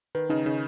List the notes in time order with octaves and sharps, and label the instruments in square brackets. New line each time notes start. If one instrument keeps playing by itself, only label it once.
[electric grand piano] D#3 [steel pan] B4
[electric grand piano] C#3 [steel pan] D#4
[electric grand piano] C#3 [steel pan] D#4